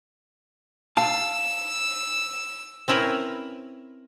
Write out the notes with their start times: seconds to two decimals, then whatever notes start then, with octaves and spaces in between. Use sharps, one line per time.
0.97 F5 A5 E6
2.88 C4 C#4 E4 A#4 B4